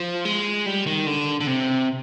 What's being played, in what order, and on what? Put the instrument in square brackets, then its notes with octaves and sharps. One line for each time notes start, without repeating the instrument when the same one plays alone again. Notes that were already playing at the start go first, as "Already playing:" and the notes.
Already playing: [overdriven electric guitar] F3
G#3
G3
D#3
D3
D3
C3